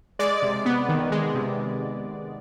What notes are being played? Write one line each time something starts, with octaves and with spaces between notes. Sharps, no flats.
G#3 D5
C3
B3
D#3
G#3
C3